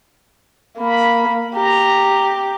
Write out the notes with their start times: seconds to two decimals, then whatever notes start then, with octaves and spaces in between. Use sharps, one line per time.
0.79 A#3 B5
1.56 G4 A#5